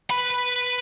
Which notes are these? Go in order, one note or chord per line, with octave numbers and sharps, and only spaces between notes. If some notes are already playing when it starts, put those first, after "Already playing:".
B4 B5